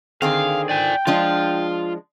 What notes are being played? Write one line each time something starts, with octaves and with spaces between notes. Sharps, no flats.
D3 D#3 C4 G#4 F5
D5 G5 G#5
F3 G#3 D4 F4